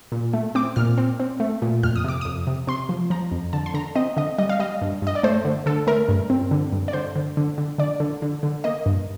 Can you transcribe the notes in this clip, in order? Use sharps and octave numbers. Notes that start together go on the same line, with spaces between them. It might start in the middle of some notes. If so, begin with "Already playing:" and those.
A#2
A3
C4 D6
A#2 F6
C4
C4
A3
A#2
F2 F6
D#6
C3 D6
F2 D#6
C3
C3 C6
F3
F3 A#5
F2
D3 A5
C6
D3 A#5
C4 D#5
D3 D#5
G3 D#5
F5
G3 D#5
G2
G2 D#5
D5
A3 C5
D3
D3 A4
A3 A#4
G2
C4
D3
G2
D5
D3 C5
D3
D3
D3
D3 D5
D3
D3
D3
A#3 D#5
G2